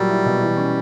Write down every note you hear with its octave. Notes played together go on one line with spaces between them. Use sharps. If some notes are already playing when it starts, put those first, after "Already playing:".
Already playing: A#2 F#3 G3
E4
B2
E3
C#4